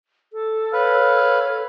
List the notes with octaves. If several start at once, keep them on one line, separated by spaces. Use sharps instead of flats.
A4
B4 C#5 F5